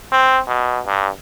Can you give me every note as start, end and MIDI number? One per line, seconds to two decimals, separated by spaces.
0.12 0.39 60
0.47 0.80 47
0.86 1.09 43